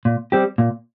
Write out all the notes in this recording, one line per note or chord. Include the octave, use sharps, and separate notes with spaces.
A#2
G3 C4 G4
A#2